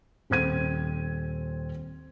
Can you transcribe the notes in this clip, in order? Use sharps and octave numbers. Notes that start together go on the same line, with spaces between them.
D#1 C4 C5 G#6 D#7